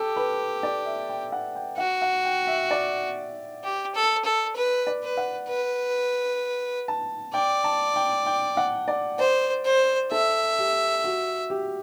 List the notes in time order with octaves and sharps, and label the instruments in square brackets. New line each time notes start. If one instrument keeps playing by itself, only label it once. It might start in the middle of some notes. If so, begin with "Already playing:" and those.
Already playing: [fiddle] G4 [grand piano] A4
[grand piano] B4
D5
E5
G5
F#5
G5
[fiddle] F#4 [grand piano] F#5
[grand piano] F#5
G5
E5
D5
[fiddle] G4
A4
A4
B4
[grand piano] D5
[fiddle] B4
[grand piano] F#5
[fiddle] B4
[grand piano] A5
[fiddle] D5 [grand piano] G5
[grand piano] A5
G5
G5
F#5
D5
[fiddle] C5 [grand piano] D5
[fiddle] C5
[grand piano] A4 [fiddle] E5
[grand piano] G4
F#4
G4